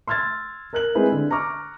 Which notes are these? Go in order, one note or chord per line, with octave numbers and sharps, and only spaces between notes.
C6 E6 F6 G#6 A6
A#4 F#6 F#7
G#3 C4 E4 G#4 B4 C5
D3
A#5 C#6 D6 F6